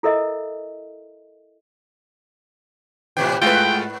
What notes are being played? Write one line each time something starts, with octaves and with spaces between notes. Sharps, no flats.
E4 A4 A#4 D#5 E5
A2 C3 E3 G5
G#2 G#3 A3 F4 B4 G5